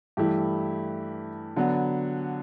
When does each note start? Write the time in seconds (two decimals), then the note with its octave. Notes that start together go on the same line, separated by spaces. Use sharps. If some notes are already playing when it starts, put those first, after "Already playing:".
0.17 G2 E3 A3 E4 G4
1.56 D3 F#3 B3